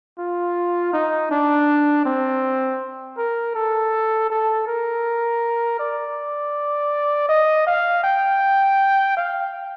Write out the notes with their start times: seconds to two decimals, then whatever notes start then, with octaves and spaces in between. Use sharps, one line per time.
0.19 F4
0.93 D#4
1.31 D4
2.05 C4
3.18 A#4
3.55 A4
4.30 A4
4.67 A#4
5.79 D5
7.29 D#5
7.67 F5
8.04 G5
9.17 F5